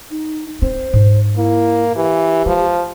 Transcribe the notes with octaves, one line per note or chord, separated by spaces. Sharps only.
D#4
C4 C5
G#2
A#3 E4
E3 G4
F3 G#3